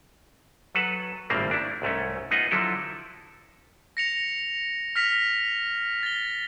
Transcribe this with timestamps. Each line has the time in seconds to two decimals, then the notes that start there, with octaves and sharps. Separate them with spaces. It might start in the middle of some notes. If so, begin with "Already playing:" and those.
0.75 F#3 A4 B4 F#5 A5
1.30 G#1 A2 C#3 G3 A#3 C4
1.51 D4 E4
1.82 C2 G#2 A3 C#4
2.31 B3 D#4 F4 D#5 F#5 G#5
2.51 D3 F3 F#3 E4 A4
3.97 A#6 C#7 F7
4.96 F6 A#6 B6 F7
6.03 A6 G7